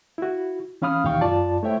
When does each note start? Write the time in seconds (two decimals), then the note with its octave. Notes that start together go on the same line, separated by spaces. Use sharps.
0.18 E4 F#4
0.82 E3 C#4 F5 B5 D#6 F6
1.04 D#2 B2 E3 F5 G5 C#6
1.21 F#2 F4 D5 A5
1.63 A3 E4 C5 C#5 E5 G5